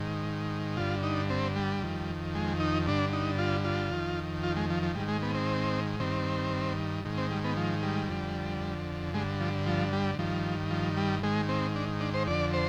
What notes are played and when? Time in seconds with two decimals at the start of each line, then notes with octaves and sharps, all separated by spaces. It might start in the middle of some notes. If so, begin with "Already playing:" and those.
Already playing: G#2 D#3
0.77 G2 D3 F4
1.03 D#4
1.30 C4
1.56 G3
1.82 F2 D#3
2.35 G#3
2.60 D#4
2.86 G2 D3 D4
3.13 D#4
3.39 F4
3.65 F4
3.92 F2 D#3
4.43 F4
4.56 G#3
4.70 F3
4.83 F3
4.95 G#2 D#3 G3
5.08 G#3
5.22 B3
5.34 C4
6.00 G2 D#3 C4
7.05 G#2 D#3
7.18 C4
7.30 G3
7.44 B3
7.57 F3
7.82 G3
8.09 F2 D3
9.14 G2 D3 G#3
9.40 F3
9.66 F3
9.93 G3
10.19 G2 D#3 F3
10.71 F3
10.97 G3
11.23 G#2 D#3 G#3
11.49 C4
11.76 D4
12.01 D4
12.14 C5
12.27 F2 D3 D5
12.53 C5